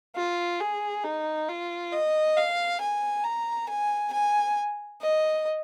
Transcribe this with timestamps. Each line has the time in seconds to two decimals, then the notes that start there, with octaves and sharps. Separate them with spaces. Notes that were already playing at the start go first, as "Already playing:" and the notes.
0.16 F4
0.60 G#4
1.04 D#4
1.48 F4
1.92 D#5
2.37 F5
2.80 G#5
3.24 A#5
3.69 G#5
4.12 G#5
5.01 D#5